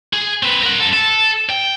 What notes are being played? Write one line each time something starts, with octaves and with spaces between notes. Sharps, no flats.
G#4
C4 B4
A#4 F#5
F#2 A4
A4
G5